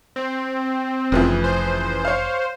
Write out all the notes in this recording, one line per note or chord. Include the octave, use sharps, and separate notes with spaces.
C4
F1 C#3 E3 F3
C5
C#5 F5